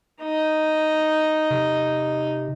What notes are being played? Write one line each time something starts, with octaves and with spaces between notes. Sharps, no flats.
D#4 D#5
C3